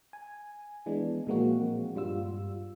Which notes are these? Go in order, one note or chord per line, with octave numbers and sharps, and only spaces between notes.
G#5
E3 G#3 B3 D4
A#2 F3 G#3 A#3 C4 F#4
G2 G3 F4 E6